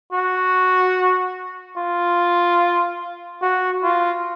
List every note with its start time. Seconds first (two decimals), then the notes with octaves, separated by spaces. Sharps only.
0.13 F#4
1.77 F4
3.42 F#4
3.83 F4